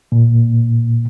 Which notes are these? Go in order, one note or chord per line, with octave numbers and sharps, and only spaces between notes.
A#2